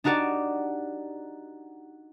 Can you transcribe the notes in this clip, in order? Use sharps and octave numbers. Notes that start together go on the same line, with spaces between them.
D4 D#4 F#4 G4 D5